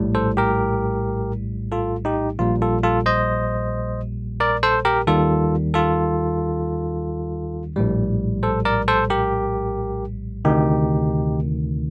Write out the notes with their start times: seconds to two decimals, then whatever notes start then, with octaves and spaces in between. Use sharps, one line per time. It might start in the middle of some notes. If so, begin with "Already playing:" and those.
Already playing: A#1 A2 G3
0.15 A4 C5
0.37 G4 A#4
1.72 F4 A4
2.05 D#4 G4
2.39 A#1 A#2 G3 F4
2.62 F4 A4
2.83 F4 A4
3.06 C5 D#5
4.40 A#4 D5
4.63 A4 C5
4.85 G4 A#4
5.07 D#2 D#3 G3 F4 A4
5.74 F4 A4
7.76 A#1 A2 G3
8.43 A4 C5
8.65 A#4 D5
8.88 A4 C5
9.10 G4 A#4
10.45 D2 C3 D#3 D#4 G4